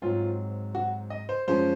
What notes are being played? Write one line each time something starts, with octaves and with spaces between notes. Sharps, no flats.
G#2 F#3 C4 F4
F#4
D#5
C5
F#2 F3 G#3 C#4 C5